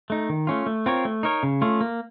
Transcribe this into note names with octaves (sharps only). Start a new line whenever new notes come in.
A3 D#4
D#3
A3 C#4 F4
A3
C4 F4 A#4 C#5
A3
D#4 A#4 C#5
C#3
A3 C#4 F4
A#3